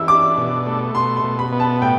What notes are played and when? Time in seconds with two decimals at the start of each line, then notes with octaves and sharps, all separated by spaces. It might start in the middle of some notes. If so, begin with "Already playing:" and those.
Already playing: E3 E6
0.08 D4 D6
0.37 B2
0.66 A3
0.95 B2 C6
1.17 C6
1.24 B2
1.39 B5
1.52 B3
1.60 A5
1.82 A2 G5